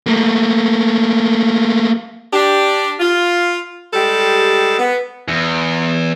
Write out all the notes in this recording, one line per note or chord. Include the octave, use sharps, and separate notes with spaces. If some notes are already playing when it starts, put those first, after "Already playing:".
A3 A#3
D4 G4
F4
G3 G#3 G4 A4
B3
E2